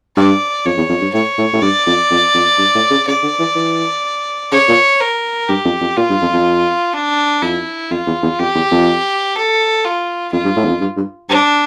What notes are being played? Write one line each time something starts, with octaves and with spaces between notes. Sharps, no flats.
G2 D5
F2 C#5
E2
F2
G2
A2 C#5
A2
A2
G2 D5
F2
F2
F2
G2
A2
C#3
C#3 D5
D3
E3
E3
C#3 C#5
A#2
A#4
G2 G4
F2
F2
A#2 F4
G2
F2
F2
D4
F2 E4
F2 F4
E2
E2
F2 G4
E2
F2
A4
F4
F2 F4
G2
A2
E2
F2
G2
G2
G2 D4